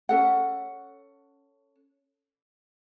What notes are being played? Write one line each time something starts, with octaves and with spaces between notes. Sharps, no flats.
C#4 A4 F#5